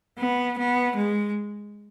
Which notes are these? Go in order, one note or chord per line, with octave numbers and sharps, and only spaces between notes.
B3
B3
G#3